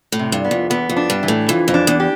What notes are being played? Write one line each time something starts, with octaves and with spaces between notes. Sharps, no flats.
A2
C3
G2
B3
F2
E2 B3
F2
D4
G2
E3
A2
F2 E3
F2
D4
E2
G4